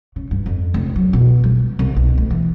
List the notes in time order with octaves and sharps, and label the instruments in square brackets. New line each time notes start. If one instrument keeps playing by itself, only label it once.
[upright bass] C#3
G2
F2
F1
F#3
B2
G3
C2
B1
D2
E3